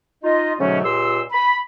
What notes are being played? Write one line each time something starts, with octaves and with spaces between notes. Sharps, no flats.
D#4 F4 D#5
G#2 B2 D3 F#3 A3 C#4
C#2 A#2 G4 C6 E6
B5